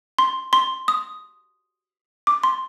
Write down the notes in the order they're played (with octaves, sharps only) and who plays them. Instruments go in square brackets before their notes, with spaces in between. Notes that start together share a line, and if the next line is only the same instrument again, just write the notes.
[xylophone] C6
C6
D#6
D6
C6